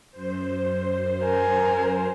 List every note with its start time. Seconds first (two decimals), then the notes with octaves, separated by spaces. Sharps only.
0.11 F#2 C5
1.23 A#4 G#5